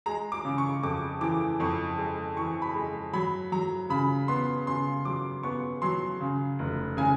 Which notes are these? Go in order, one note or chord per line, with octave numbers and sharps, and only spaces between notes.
G#3 A#5
D6
C#3
C#6
F2 D6
E3 D6
F2 C#6
G#3
E3 C#6
B5
G#3
F#3 B5
F#3 A#5
C#3 B5
B3 C6
C#3 C6
F#3 D6
B3 C#6
F#3 C6
C#3
F1
C#3 G#5